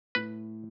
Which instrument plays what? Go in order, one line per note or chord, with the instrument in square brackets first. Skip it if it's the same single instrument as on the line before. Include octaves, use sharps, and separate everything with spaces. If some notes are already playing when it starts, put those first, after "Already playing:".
[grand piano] A2 [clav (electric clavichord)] B4